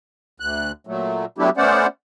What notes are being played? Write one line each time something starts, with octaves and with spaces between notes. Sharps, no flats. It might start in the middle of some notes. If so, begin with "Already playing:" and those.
D2 F#6
A#2 F#3 A3
F#3 A3 B3 D4 E4 G4
A3 B3 C#4 C5 D5 F#5